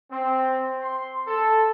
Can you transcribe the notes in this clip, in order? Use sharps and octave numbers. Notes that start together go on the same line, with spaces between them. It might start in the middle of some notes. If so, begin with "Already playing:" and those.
C4
C6
A4